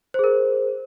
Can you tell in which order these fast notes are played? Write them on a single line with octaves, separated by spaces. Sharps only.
C5 G#4 A#4